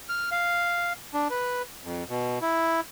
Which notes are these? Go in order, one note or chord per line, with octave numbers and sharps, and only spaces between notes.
F6
F5
D4
B4
F2
B2
E4